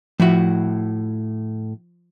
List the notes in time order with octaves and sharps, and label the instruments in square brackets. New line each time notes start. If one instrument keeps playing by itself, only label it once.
[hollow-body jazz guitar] A2 E4 F#4 [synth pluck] F3